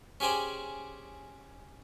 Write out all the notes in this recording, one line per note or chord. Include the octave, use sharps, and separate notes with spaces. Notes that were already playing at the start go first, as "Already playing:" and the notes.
C#4 G4 G#4 C5 D5